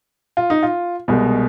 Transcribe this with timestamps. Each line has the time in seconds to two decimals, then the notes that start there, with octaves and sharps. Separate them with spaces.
0.37 F4
0.50 D#4
0.63 F4
1.08 C2 B2 G#3